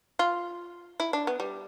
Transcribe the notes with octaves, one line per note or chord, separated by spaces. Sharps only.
F4
E4
D4
B3
G3